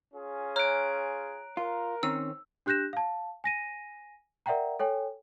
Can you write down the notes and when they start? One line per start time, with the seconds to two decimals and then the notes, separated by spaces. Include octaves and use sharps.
0.13 C#4 F4 G#4
0.56 C#5 A#5 F6 F#6 D7
1.57 F4 A#4
2.03 D#3 C4 C#4 E6
2.66 D4 G4 F#6 G6 A#6 E7
2.93 F5 A5
3.44 G#5 A#6 D#7
4.46 A#4 D5 E5 F#5 G5 A#5
4.79 A4 C#5 G5 G#5